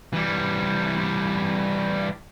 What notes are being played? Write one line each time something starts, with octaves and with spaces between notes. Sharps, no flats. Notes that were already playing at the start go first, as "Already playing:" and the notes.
E3 G3